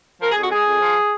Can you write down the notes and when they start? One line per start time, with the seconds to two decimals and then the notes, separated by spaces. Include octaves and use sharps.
0.22 F3 A#4
0.32 G#4
0.37 F2 F#4
0.51 G#3 G#4
0.67 F2
0.81 F3